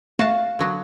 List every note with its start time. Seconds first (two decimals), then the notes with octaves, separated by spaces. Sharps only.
0.19 A3 F#4 F5 F#5 A5
0.59 D3 F#3 B3